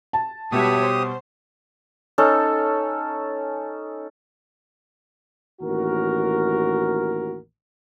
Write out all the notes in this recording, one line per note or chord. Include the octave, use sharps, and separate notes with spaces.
A5
B2 G3 G4 B4 C#5 E5 D#6
C5
C#4 D#4 A4
A1 D#2 F#4 A#4